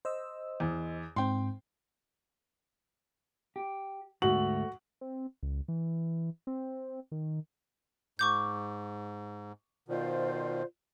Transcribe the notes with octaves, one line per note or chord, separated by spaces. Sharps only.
C5 D#5 E6
E2
G#2 C4 G5 C6
G4
D2 G#2 A3 F#4 F#7
C4
C#2
E3
C4
D#3
G#2 C#6 D6 G6
B2 D#3 F4 C5 D5